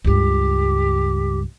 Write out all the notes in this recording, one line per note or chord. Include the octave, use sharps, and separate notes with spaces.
C#2 G2 G4